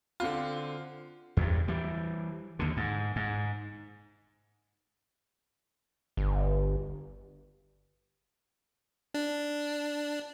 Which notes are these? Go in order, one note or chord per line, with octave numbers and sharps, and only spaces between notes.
D3 C4 F4
E2 G2
E3 G3
D#2 D3
G#2
G#2
G1
D4